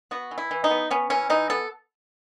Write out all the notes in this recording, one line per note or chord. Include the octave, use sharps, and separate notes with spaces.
B3 F#4
E3
E4
E3
D#4
B3
B3 C#4
E3 C#4
E3 D#4
B3 A4